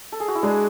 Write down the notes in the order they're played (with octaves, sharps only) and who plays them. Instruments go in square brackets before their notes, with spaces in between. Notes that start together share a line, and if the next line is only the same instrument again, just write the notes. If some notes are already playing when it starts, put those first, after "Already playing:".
[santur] A4
G#4
F#4
E4
[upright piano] G#3 [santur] D4